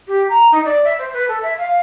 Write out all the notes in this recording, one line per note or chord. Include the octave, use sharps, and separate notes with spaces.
G4
A#5
D#4
D5
E5
C5
B4
A4
E5
F5